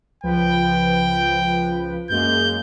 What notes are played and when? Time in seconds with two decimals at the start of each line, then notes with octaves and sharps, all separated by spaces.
0.24 C#2 F3 B4 G5
2.10 F#2 G#3 A#3 G6